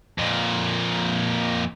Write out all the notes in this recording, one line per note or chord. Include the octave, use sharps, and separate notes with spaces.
F2 A#2